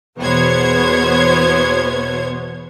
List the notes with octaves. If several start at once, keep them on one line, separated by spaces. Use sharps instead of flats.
E2 B2 B3 C5 C#5 G#6